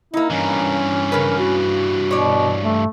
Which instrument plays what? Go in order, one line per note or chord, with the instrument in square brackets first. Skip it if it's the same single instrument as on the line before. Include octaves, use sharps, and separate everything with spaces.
[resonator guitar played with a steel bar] A#3 D#4 [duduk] E4
[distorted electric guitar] G2 E3 [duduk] C#4
[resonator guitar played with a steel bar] C#3 B4 [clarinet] A#4
[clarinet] F#4
[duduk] B2 [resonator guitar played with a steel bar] C#5 D5
[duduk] A3